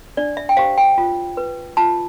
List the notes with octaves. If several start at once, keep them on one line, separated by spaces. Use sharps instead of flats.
D4 D5
E5
G5
G4 C5 F5
G5
F4
B4
F4 A5